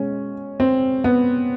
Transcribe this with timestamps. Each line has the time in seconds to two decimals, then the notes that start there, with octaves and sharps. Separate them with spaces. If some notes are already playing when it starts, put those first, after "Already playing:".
Already playing: B2 G#3 C#4
0.60 C4
1.04 B3